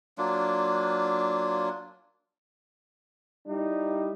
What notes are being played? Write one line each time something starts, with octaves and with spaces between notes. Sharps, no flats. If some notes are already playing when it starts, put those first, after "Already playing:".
F#3 A#3 D4 F4
G3 D#4 E4